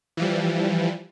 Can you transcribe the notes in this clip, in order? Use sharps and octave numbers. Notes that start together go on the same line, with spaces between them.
E3 F3 G3